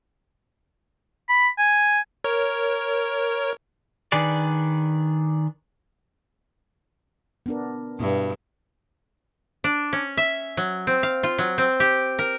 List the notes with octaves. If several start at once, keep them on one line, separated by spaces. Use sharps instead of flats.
B5
G#5
A#4 C#5
D#3 D4 G#4 B4 D5
B3 D4 A#4
G2 B2 E4 E5
D4
C#4
E5
F#3
C4
F5
F4
F#3
C4
G4
A#4